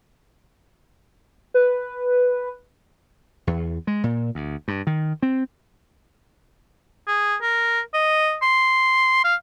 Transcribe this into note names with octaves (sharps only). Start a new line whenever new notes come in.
B4
E2
G#3
A#2
D2
G2
D#3
C4
G#4
A#4
D#5
C6
F5